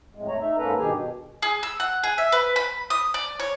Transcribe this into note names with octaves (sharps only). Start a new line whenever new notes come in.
F2 A2 G#3
F2 A2 A3 C#5 A#5
D#4 E5
G#2 A#3 C#4 A4 B4 A#5
G2 B2 D#3 G4 G#4 G#5
B2
G#4
E6
F#5
G#4
E5
B4
B5
D#6
D5
C#5